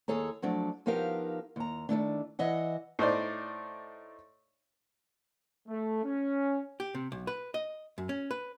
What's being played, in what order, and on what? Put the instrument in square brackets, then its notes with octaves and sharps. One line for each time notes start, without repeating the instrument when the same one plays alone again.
[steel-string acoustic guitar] D#2 G#4 A4 C#5 A#5
F3 F#3 A3 D4
F3 B3 D#4 G4 A#4 F5
D#2 A#5
D#3 F#3 A3 D4
E3 D#5 E5 F#5
[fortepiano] A2 D#4 C5 D5
[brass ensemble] A3
C#4
[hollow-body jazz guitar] G4
C3
B1
B4
D#5
F#2
C#4
B4